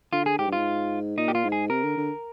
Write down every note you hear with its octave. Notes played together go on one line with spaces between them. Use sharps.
D3 F4
G#4
G#2 G4
G2
G#2 F4
A#2 D#4
G4
F4
G#2
G#4
C3 A#4
D3
D3